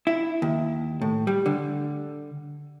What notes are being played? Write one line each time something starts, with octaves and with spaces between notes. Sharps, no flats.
E4
D#2
A2
G3
D3